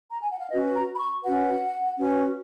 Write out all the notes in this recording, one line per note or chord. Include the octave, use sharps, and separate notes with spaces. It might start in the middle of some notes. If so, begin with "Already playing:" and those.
A#5
G#5
F#5
F5
C#4 F#4 B4 D#5
A#5
B5
C#6
C#4 F#4 B4 F#5
C#4 F#4 B4